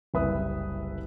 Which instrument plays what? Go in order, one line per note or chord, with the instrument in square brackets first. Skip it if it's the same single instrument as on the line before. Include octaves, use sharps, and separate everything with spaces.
[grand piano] F#1 C2 G3 B4 E5 D#6